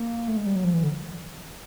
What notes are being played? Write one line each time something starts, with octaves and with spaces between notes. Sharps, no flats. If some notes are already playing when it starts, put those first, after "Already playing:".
Already playing: A#3
A3
G#3
G3
F#3
F3
E3
D3